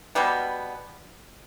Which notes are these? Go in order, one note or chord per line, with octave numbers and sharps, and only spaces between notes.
B2 G3 B3